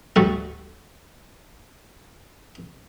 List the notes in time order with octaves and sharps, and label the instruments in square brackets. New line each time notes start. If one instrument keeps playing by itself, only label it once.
[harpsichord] D2 G2 G3 F#4 A4 C#6